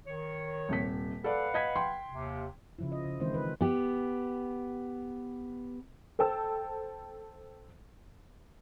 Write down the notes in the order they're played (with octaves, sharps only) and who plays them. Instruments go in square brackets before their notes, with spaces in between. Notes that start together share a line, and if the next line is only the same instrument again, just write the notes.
[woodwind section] D#3 C#5
[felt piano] D#1 C3 B6
[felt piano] A4 D5 [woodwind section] B4 F5 F#5
[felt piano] D#5 G#6 B6
G5 C6
[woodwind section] D#2 C3
[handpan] C#3 F3 E4
D#5
C#3
D#3 E3 G#3 C4 E4 C5
B4
[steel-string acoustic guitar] B3 G4
[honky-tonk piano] A4 C5 G5 A5 E6